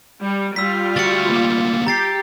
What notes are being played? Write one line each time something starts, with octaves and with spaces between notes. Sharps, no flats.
G3
G3 F4 E6 B6
D2 F#4 A6 C#7
D2 A#3
G4 A#5 A6 C7